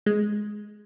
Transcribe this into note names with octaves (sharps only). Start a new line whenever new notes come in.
G#3